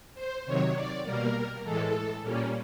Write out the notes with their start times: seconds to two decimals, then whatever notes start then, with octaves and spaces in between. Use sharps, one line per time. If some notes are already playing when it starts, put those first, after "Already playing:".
0.15 C5
0.45 C3 D#3 F#3 C#5
0.74 D5
1.04 B2 G3 A#3 A#4
1.63 A2 E3 G#3 A4
2.22 A#2 G3 A#3 C#4